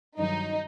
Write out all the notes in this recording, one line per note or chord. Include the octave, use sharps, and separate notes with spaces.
G2 D#3 F#3 D#4